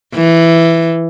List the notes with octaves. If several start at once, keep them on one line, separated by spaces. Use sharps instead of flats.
E3